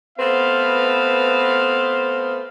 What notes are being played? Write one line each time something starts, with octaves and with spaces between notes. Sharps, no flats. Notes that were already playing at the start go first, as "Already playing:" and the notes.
A3 B3 C4 B4 F5